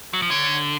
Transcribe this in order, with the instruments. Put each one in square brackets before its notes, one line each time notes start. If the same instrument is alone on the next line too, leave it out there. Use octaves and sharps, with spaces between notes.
[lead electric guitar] F#3
F3
[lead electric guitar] D3 [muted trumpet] C#5